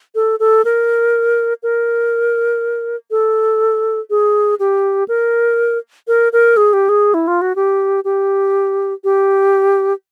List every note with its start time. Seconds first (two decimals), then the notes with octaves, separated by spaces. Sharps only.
0.15 A4
0.40 A4
0.65 A#4
1.63 A#4
3.11 A4
4.10 G#4
4.60 G4
5.08 A#4
6.08 A#4
6.33 A#4
6.57 G#4
6.73 G4
6.89 G#4
7.14 E4
7.28 F4
7.42 F#4
7.56 G4
8.05 G4
9.04 G4